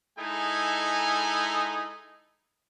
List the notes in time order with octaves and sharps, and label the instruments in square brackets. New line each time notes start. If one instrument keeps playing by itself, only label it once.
[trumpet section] G#3 D#4 E4 G#4 A4 G#5